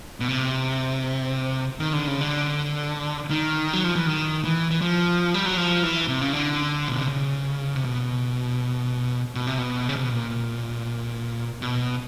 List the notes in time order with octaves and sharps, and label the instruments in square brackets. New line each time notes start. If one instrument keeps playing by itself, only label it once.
[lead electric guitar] B2
C3
D#3
D3
C#3
D3
D#3
F#3
F3
E3
D#3
E3
E3
F3
G3
F#3
F3
E3
C3
C#3
D3
B2
C3
C#3
C3
B2
B2
C3
B2
C#3
C3
B2
A#2
B2